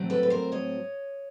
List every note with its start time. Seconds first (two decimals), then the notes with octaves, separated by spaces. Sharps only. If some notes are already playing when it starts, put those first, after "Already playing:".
Already playing: A2 F#3 A3 C4
0.10 A4 B4
0.23 B4
0.30 A#4 C5
0.52 C#5 D#5